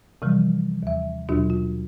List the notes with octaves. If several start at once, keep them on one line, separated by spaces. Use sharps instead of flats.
C3 E3 F3 G3
D#2 E5
D#2 B2 F#3 D4 F4 F#4
F4